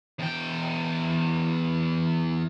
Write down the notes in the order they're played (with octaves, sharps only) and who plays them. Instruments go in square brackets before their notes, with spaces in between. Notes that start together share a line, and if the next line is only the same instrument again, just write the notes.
[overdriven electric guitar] E2 G5